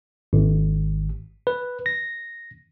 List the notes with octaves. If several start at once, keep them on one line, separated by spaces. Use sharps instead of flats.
G#1
B4
A#6